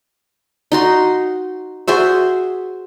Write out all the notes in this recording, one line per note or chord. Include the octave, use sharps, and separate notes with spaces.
D#4 F#4 C6
F#4 G#4 C5 E5